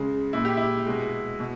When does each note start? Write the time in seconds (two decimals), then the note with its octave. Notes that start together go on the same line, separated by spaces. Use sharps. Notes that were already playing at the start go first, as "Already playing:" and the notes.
Already playing: C#3 G#3
0.33 A#2 G#3 E4
0.45 G4
0.57 E4
0.86 B2 G#3
1.40 B2